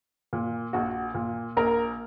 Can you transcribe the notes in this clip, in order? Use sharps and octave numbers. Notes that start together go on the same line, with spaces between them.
A#2
A#1 F#4
A#2
A#1 A#4